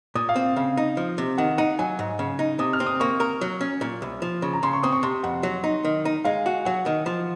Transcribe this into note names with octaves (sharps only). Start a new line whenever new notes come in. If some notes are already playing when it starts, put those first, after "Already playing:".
A#2 D#6
F5
C4
C#3 F5
D#4
F3
C3
D#3 F#5
D#4 F#5
F#3 G#5
G#2
C#3
D#4
C3 D#6
F6
C4
D#6
A#3 C#6
A#4
F#3
C#4
A#2
C2
F3
C#3
A#5
C#3 C6
C#6
C4 D#6
C#6
C3 C6
F2 F#5
F#3
D#4
D#3
D#4
G#3 F5
F#4
F#3 F#5
D#3
F3